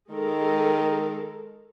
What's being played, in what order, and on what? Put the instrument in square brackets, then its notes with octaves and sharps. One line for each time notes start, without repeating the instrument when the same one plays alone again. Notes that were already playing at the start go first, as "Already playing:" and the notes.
[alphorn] D#3 [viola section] G#3 A4 A#4